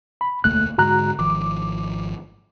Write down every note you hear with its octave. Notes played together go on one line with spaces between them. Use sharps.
B5
E1 D2 A3 A#3 F#6
G#2 D3 G#3 F#4 A#5 F#6
G#1 D#3 F3 D6